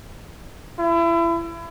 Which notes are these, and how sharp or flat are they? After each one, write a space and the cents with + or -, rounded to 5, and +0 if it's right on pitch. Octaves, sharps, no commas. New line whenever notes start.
E4 +30